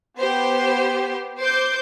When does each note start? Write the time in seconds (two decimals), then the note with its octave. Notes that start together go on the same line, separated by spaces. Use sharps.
0.20 B3 G4 C5
1.40 C5 D6 G6